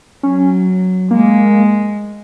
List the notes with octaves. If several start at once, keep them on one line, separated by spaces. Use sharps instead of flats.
F#3 C#4
G#3 A#3